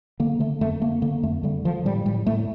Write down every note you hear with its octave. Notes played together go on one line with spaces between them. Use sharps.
D3 A#3
D3 A3
F2 A3
D3 A#3
D3 A#3
F2 A3
D3 G3
D3 F3
A2 G3
A2 G3
A2 A3